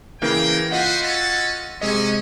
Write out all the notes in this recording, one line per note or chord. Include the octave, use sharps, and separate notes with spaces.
C#3 E3 A#3 A#4 G5
F4 F#4 B4 C5 D#5 F#5
C#4 F#4 A4
C3 G#3 C#4 D#5